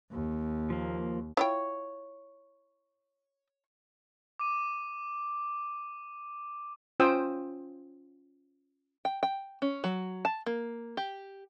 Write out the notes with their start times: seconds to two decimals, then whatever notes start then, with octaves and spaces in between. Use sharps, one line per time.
0.11 D#2
0.70 F3 A#3
1.37 E4 F4 C#5 G5
4.39 D6 D#7
7.00 C#4 F4 C5 G5 D#6 E6
9.05 G5
9.23 G5
9.62 C#4
9.84 F#3
10.25 A5
10.46 A#3
10.97 G4